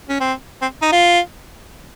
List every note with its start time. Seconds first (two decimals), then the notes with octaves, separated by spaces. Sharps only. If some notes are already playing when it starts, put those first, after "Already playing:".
0.09 C#4
0.20 C4
0.62 C4
0.82 D#4
0.92 F4